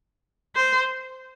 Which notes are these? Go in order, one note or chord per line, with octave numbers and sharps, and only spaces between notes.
C5